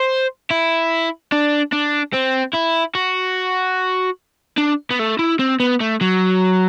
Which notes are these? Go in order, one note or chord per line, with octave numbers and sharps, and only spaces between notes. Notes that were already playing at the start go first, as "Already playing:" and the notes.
Already playing: C5
E4
D4
D4
C4
E4
F#4
D4
B3
A3
E4
C4
B3
A3
F#3